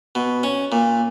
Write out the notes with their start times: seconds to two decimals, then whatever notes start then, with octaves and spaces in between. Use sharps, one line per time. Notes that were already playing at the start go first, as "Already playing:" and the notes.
0.15 B2
0.43 C#4
0.72 A#2